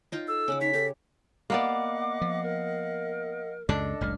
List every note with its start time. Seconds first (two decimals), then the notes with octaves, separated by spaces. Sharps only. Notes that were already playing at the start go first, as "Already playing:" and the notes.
0.12 D#4 F4 G5
0.28 A4 E6
0.48 C#3 F#5 D6
0.61 D#4 C#5 B6
0.74 G4 A4
1.50 A#3 B3 D5 D#5 F5 F#5 D6
2.21 F3
2.42 A#4
3.69 C#2 F#2 C#3 D4 A4 D#5
4.01 F#1 C#2 A2 F6